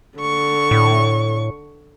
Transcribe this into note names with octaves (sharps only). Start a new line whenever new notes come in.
D3 C#6
A2